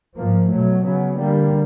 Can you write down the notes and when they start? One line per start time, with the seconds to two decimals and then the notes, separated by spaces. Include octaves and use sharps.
0.16 G#2 F3 A#3
0.50 B2 F#3 A3
0.84 C#3 F#3 B3
1.19 D3 G3 A#3